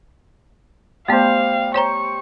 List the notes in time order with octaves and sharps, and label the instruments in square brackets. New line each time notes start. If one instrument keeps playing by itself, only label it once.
[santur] G3 C5 [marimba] A3 B3 [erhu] F5
[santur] C5 [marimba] C#5 G5 A#5 [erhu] C#6